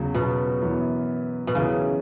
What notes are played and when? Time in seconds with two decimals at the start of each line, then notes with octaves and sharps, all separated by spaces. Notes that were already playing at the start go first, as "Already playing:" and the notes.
Already playing: E2 C#3 F#3
0.15 B2
0.62 F#2 E3 B3
1.47 B2
1.55 F#2 C#3 E3 B3